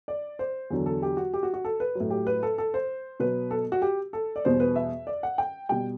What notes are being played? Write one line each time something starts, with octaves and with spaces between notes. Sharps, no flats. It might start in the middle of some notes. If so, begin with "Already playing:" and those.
D5
C5
E2 D3 F#3
A4
G4
F#4
G4
F#4
F#4
A4
B4
A2 F#3
G4
B4
A4
A4
C5
B2 F#3 B4
A4
F#4
G4
A4
D5
E2 B2 G3 C5
B4
E5
D5
F#5
G5
B2 G3 G5